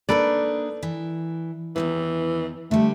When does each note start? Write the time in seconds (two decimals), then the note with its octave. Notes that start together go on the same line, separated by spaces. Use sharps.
0.09 A#3 D4 D#4 A4 B4 D5
0.83 E3
1.76 E2 G2 D#3 E3
2.71 D3 G3 A3